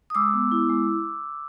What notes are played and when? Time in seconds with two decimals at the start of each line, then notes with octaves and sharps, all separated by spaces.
0.10 D#6
0.15 G#3 D6 E6
0.34 B3
0.52 E4
0.70 G#3